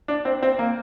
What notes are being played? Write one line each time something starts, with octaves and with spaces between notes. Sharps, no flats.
D4
C4
C4
A#3